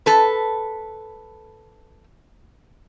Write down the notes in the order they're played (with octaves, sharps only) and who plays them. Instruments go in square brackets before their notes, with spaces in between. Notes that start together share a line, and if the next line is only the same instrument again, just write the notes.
[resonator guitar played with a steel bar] A4 B4